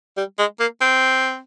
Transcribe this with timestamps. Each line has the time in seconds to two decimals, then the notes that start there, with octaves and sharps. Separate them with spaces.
0.17 G3
0.39 G#3
0.60 A#3
0.81 C4